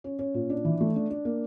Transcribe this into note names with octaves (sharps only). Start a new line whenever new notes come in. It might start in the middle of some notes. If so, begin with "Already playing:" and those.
C#4
C#4
A#2
D4
E3
A3
D4
D4
A#3